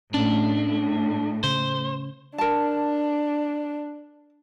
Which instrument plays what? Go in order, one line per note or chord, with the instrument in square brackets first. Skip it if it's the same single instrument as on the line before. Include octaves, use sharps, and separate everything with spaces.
[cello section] A2 [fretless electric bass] C#4 [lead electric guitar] D4
[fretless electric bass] C#3 [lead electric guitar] C5
[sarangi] D4 [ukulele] A#4 A5